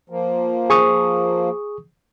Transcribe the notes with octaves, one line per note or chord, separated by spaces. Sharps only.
F3 A#3
G#4 C#6 D#6